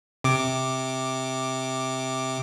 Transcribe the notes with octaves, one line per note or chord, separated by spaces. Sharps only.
C3 D6